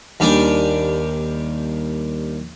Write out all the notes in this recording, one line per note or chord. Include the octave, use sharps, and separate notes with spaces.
D#2 G3 D4 D5 G5 G#5